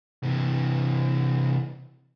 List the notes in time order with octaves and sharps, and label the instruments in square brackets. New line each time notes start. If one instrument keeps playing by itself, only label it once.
[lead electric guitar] C3 E3